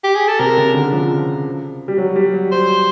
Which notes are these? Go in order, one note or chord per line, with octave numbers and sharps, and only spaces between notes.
G4
G#4
A4
C3 A#4
C#3
D3
F3
G3
F#3
G3
F#3
C5